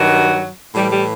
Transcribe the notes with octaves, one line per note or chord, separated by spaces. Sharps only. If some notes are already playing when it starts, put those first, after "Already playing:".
Already playing: G2 D#3 F#3 F#4
A2 E3 G3
G3